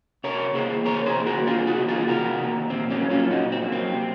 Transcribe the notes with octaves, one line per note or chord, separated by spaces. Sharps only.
C3 A#4 C#5
D#3 A#3 G#4 C5
C3 A#4 C#5
G#4 C5
D#3 A#3
F#4 A#4
C3 F4 G#4
D#4 F#4
D#3 A#3
F4 G#4
C3 F#4 A#4
D#3 A#3
A#2 C4
A#3 C#4
F#3 A#3
C#4 F4
A#2 D#4 F#4
C4
F#3 A#3
C4
C3